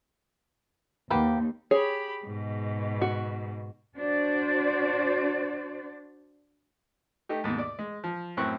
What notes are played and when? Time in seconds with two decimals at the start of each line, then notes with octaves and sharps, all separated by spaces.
1.10 D#2 A#3 B3 G4
1.71 G4 G#4 C#5 B5
2.24 G#2 B2
3.01 F#4
3.97 D4 F#4 C5 D5
7.29 A3 D#4 G4
7.44 D#2 G#2 B2
7.58 D5
7.79 G#3
8.04 F3
8.37 F#2 A2 C4 C#6 F#6